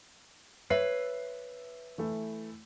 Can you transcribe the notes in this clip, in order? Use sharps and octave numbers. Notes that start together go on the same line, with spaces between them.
B4 C#5 E5 C7
E3 A3 E4